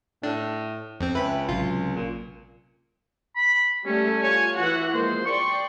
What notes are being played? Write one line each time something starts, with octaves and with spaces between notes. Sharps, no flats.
A2 D4
F2 C4
C#2 B4 E5 G5 B5
A1 C3 F#3 F4
A#2
B5
G3 A3 C#4
F4 C#5 G#5
E3 F#4 F#5
F3 G#3 A#3 C5
D5 G5 C6 C#6